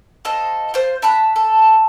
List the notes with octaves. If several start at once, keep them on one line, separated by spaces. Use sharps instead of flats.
F4 A4 C5 D#5
F4 C5
E5 A5 B5 F#6
A4